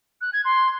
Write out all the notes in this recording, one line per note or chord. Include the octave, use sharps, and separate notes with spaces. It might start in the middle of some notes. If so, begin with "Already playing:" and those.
F#6
G#6
C6